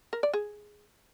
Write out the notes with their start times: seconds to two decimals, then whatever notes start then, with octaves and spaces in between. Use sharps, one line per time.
0.13 A#4
0.23 D5
0.33 G#4